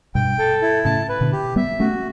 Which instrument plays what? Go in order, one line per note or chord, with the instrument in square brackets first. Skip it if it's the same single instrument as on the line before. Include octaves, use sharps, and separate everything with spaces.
[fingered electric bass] G2 B2 [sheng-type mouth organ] G5
[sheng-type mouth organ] A4
E4
[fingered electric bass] A2 C#3 [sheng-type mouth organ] A5
[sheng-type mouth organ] B4
[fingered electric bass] B2 D3
[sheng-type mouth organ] G4
[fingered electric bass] G3 B3 [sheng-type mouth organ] E5
[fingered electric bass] A3 C#4 [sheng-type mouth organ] F#4